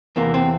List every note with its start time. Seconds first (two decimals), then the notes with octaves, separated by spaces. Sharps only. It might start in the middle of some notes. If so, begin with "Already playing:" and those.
0.16 E2 C3 E3 A#3
0.34 C4